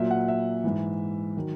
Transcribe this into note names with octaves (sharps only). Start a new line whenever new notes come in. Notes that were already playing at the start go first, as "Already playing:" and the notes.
Already playing: A#2 F#3 E5
F#5
E5
G#2 E3
D#3 F#3